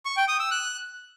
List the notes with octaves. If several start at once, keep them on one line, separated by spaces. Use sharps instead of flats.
C#6
G5
D#6
E6
F#6